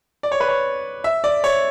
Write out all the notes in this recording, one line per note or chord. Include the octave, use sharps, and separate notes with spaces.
D5
C#5
B4
C#5
E5
D5
C#5